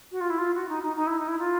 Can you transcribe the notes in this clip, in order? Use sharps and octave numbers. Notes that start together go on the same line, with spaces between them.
F#4
F4
E4
F4
F#4
D#4
D#4
D#4
E4
D#4
E4
F4